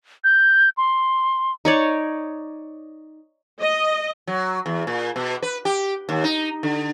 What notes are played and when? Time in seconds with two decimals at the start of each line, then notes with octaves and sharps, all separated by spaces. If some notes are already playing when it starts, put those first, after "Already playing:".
0.24 G6
0.77 C6
1.65 D#4 C#5 D5
3.60 D#5
4.27 F#3
4.66 E2
4.87 A#2
5.16 B2
5.42 B4
5.65 G4
6.09 D#2
6.24 D#4
6.63 D3